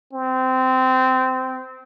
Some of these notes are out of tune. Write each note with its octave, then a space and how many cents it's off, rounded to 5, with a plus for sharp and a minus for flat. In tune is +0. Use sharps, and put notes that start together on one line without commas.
C4 -20